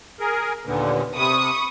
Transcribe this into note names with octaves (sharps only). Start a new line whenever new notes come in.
G#4 A#4
D#2 A#2 D3 B3
C3 B5 C#6 D#6